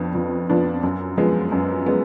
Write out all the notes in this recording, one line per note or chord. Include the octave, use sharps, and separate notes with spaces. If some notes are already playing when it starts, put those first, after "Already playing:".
Already playing: F2 F3 B3 D4
F2
F3 B3 D4
F#2
F3 G#3 B3
F#2
G#3 B3